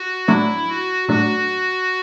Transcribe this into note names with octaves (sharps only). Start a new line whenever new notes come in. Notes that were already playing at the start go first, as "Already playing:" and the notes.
Already playing: F#4
A2 F#3 A3 D4 E4
F#4
A2 F#3 A3 D4 F#4